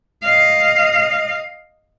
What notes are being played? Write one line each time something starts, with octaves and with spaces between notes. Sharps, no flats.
D#5 F5